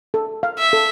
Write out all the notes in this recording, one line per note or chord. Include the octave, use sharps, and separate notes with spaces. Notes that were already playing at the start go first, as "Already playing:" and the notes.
A4
F5
E5
A4